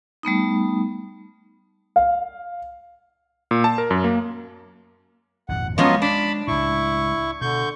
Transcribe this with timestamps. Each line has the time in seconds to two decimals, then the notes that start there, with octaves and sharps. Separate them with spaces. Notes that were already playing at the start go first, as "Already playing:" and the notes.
0.23 G3 A3 B3 D#4
1.96 F5
3.51 A#2
3.64 A5
3.78 A#4
3.91 F#2
4.04 A#3
5.49 G#1 F2 A#2 F#5
5.78 F3 F#3 G#3 B3 C#4 F4 D#5
6.02 D4 A5 B5
6.48 C#2 A2 E4 C#6
7.41 B2 D3 C#6 G6